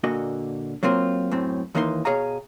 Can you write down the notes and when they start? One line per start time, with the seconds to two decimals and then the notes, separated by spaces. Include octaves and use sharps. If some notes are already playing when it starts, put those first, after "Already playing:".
0.04 A#2 D3 A#3 F#4 D#5
0.83 F#3 A#3 C4 F4
1.31 F#2 A2 C4
1.75 D#2 E3 A#3 D#4 C5 C6
2.05 B2 G#4 C#5 D#5 F5 A#5